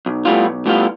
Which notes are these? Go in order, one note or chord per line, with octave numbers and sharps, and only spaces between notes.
B1
A2 G3 B3 F4
B1
A2 G3 B3 F4